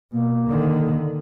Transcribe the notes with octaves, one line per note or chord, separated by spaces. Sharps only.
B2 A#3
D3 D#3